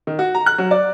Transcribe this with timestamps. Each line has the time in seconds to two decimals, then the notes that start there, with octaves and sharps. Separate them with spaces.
0.07 D#3
0.19 F#4
0.35 A#5
0.46 F#6
0.58 F#3
0.71 D5